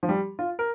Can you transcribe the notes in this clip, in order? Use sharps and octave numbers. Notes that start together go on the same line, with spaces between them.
F3
G3
F4
A#4